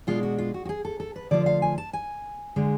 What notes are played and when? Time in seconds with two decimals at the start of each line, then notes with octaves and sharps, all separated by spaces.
0.07 B2 G#3 D4 F4
0.23 F#4
0.38 F4
0.54 F#4
0.65 F#4
0.69 G#4
0.85 A4
1.00 A4
1.16 B4
1.31 D3 F3 A3 F4 D5
1.46 F5
1.62 G#5
1.78 A5
1.93 G#5
2.56 D3 G#3